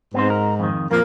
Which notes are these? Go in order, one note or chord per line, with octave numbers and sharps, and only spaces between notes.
G#2 B3 C4 C5
A#4
F2 D#3
F2 A#2 F3 A#3